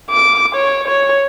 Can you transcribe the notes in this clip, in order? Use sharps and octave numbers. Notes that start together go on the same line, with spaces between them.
D6
C#5
C#5